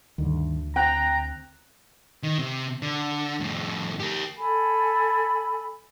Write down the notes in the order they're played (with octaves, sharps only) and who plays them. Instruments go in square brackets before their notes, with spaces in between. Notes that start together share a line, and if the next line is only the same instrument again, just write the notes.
[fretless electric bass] D2 [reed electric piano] G2 D3 D#3
[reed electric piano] C4 [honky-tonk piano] G5 F#6 [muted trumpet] A#5
[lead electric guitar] D#3
C3
D3
F2 A2
G4 A#4
[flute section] A4 G#5 B5